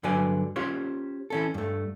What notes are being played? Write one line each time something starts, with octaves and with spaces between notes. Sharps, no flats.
G2 D3 F#3 B4 D5 G#5
C#4 F4 G4 C5 C#5
E3 C#4 A4
G2 A3